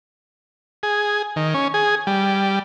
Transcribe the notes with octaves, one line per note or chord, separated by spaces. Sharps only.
G#4
D#3
C#4
G#4
G3